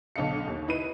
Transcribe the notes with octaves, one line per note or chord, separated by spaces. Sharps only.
B1 D3 A4 D#5 F5 C#7
D#2
D#4 E4 B4 D#7